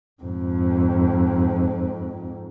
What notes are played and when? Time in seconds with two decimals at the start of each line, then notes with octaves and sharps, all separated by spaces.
0.23 F2 G#2